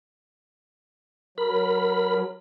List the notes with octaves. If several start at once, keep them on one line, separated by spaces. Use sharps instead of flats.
F#3 A#4 B5